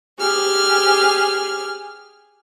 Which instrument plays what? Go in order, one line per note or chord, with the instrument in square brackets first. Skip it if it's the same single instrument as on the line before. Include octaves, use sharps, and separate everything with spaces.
[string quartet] G4 G#4 F6